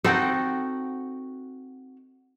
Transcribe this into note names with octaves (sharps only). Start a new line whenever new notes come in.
C4 D#4 F#4 A4 F#5 G5